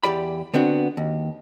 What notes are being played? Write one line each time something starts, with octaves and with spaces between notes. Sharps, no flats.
E2 G4 D5 B5
D3 B3 C4 D4 F#4
D#2